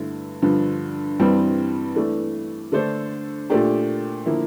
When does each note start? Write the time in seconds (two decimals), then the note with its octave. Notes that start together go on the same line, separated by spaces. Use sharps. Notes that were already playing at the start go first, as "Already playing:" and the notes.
Already playing: G2 D3 A3 E4
0.42 G2 D3 F3
1.19 G2 E3 G3 C4
1.95 E3 A3 D4
2.72 D3 A3 D4 A4 C5
3.50 A#2 A3 D4 G4
4.26 D3 F3 A#3 E4